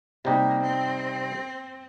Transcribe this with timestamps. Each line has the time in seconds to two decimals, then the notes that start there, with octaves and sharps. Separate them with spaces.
0.24 C3 G3 A#3 D#4 G4
0.63 C4